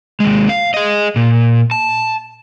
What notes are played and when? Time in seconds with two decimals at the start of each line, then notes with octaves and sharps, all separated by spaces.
0.20 D#2 G#3
0.49 F5
0.74 G#4 D#5
1.16 A#2
1.71 A5